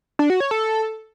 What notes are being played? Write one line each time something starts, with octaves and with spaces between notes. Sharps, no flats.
D4
F#4
C#5
A4